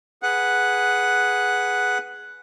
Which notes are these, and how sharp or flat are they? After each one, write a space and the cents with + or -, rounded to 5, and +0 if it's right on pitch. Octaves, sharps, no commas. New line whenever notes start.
G#4 +0 B4 +0 F#5 +0